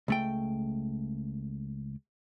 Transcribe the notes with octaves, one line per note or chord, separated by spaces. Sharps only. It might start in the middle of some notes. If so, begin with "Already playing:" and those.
C#2 A3 G5